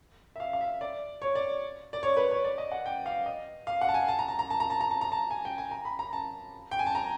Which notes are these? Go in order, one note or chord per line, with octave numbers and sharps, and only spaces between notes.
E5
F5
F5
E5
D5
C#5
D5
D5
C#5
B4
C#5
D5
D#5
F#5
G5
F5
D#5
F5
F#5
A5
G#5
A5
A#5
A5
A#5
A5
A#5
A5
A#5
A5
A#5
A5
G#5
G5
G#5
A#5
B5
A#5
A5
G5
G#5
A5
A#5